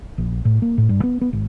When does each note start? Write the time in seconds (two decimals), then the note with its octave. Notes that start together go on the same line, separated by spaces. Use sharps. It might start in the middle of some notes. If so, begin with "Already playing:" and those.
0.18 A#1
0.45 A2
0.62 A#3
0.78 A2
0.89 G2
1.04 B3
1.21 B3
1.33 G#1